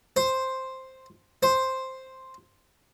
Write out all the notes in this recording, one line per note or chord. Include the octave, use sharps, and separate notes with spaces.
C5
C5